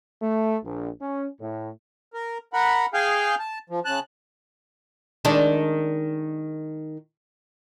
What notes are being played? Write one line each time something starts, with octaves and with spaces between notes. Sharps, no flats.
A3
A#1
C#4
A2
A#4
A#4 F#5 B5
G#4 F5 G5 G#5 F6 G6
A5
F3
C#3 A5 F#6
D#3 G#3 D4